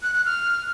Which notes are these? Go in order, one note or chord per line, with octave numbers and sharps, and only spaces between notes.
F#6
F#6
F6